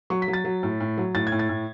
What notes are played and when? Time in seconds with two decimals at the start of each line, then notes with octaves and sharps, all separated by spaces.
0.10 F#3 C#6
0.22 B6
0.28 F#3
0.33 A6
0.45 F#3
0.63 A2
0.80 A2
0.98 F#3
1.15 A2 A6
1.27 G#6
1.32 A2
1.39 A6
1.49 A2